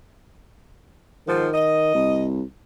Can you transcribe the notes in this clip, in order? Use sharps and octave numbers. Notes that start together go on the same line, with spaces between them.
G#2 D#3 F3
D#5
C2